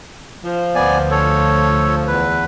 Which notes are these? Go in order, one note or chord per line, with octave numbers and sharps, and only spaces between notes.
F3
D2 B3 D5 G#5
A4 C#5
E2 B4